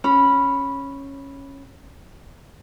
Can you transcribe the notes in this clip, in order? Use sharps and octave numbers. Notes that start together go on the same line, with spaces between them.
C#4 B5